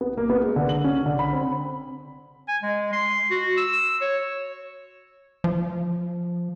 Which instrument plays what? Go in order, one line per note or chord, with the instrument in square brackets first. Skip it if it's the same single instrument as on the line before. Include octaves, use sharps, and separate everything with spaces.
[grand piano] B3
A#3
B3
G#3
D3
F#7
C#4
D3
B5
C4
[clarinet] G#5
G#3
C6
F#4
E6
C#5
[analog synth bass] F3